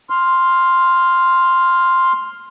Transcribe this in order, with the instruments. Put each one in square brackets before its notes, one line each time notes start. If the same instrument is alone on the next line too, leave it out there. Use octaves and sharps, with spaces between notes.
[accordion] C6 F6